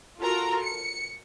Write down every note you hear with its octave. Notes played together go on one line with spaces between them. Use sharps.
F4 F#4 A4 A#4 A#5
C#7